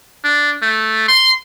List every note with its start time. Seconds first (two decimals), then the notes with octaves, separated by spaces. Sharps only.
0.24 D4
0.62 A3
1.08 C6